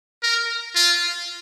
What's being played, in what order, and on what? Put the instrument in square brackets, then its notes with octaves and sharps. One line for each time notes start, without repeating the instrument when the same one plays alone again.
[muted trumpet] A#4
F4